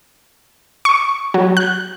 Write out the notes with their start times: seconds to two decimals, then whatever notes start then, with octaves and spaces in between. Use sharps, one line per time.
0.85 C#6
1.34 F#3
1.57 F#6